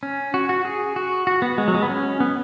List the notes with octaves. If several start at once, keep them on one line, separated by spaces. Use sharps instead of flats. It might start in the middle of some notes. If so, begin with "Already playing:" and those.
C#4
F#4
F#4
G#4
F#4
F#4
B3
G#3
F#3
G#3
B3
C#4
B3